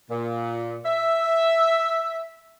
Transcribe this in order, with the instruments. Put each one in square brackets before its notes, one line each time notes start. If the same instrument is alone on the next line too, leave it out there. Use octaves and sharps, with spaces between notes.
[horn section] A#2
E5